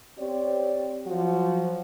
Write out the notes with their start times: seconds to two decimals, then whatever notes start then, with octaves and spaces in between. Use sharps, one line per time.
0.19 C4 G4 C#5 D5
1.07 F3 F#3 F#4